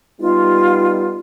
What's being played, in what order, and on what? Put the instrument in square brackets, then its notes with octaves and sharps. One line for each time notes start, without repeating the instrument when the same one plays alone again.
[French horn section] G3 B3 D#4 [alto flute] F4